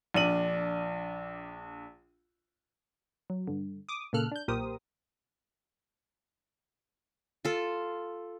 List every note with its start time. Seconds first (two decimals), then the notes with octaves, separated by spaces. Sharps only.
0.14 A#1 D4 D#7 F#7
3.30 F#3
3.47 G2 D3
3.89 D6 D#6
4.13 A#2 C#3 A#3 A4 F6 F#6
4.32 D4 G6
4.48 B1 A#2 G4 A#4 C5 D#6
7.45 F4 A4